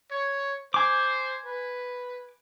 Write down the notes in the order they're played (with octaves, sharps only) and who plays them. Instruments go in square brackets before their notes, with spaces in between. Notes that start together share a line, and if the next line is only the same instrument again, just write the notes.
[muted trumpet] C#5
[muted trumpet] C5 [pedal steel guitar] G#5 D6
[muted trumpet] B4